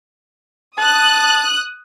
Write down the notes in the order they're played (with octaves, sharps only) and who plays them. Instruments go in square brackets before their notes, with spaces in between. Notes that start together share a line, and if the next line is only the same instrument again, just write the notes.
[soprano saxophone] A5 [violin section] D#6 F#6